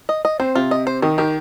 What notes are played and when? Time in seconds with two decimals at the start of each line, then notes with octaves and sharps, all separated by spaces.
0.09 D#5
0.25 D#5
0.40 C4 C5
0.55 C3 F4
0.71 D#5
0.87 C5
1.02 D#3 D#5
1.18 D#3 G4